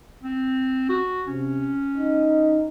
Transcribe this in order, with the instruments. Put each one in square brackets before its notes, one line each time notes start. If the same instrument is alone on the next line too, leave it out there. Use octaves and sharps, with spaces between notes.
[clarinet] C4
F#4
[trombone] C3 [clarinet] C#4
[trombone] D#4